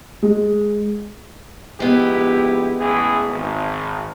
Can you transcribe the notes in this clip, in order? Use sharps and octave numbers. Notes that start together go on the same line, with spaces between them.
G#3
A#1 G#3 B3 E4 G4
A1 E3 G#4
G#1